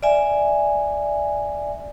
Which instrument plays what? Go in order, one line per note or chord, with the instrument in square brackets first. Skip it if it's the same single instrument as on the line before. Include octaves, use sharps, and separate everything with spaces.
[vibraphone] D5 E5 G#5